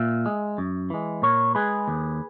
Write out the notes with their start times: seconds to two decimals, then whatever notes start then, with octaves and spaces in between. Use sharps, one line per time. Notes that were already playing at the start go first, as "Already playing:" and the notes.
Already playing: A#2 E5
0.26 G#3
0.58 F#2
0.90 E3 G#3
1.22 A#2 A#4 C#5
1.55 G#3 G#4 B4
1.88 D#2